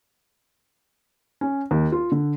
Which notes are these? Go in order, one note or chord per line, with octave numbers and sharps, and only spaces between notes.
C#4
D#2
F4
D3